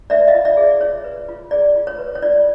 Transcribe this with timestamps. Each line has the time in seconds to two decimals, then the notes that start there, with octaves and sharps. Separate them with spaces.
0.10 B4 D5 E5
0.28 D#5 F5
0.34 F4
0.45 D5 E5
0.57 G#4
0.64 D5
0.81 F4 C#5
1.04 B4
1.29 F4
1.51 G#4 D5
1.76 F4
1.87 C#5
1.98 B4
2.15 C#5
2.22 F4 D5